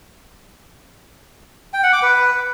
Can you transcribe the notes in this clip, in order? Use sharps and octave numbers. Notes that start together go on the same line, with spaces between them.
G5
F#5
D6
B4